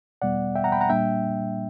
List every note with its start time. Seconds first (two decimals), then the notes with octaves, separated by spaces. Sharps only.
0.22 E2 B2 G3 B3 D5 F#5
0.55 E5 G5
0.64 F#5 A#5
0.72 G5 B5
0.81 F#5 A#5
0.89 A#2 G3 A#3 D4 E5 G5